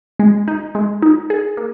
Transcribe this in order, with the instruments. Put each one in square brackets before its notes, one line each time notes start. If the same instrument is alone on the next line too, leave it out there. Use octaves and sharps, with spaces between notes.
[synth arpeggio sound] G#3
D#4
G#3
D#4
G#4
A#3